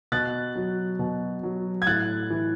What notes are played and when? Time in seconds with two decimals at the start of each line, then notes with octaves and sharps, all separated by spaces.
0.12 B2 F#6 A6
0.56 F#3
0.99 B2
1.43 F#3
1.82 G#6
1.87 A2 F#6 A6
2.30 E3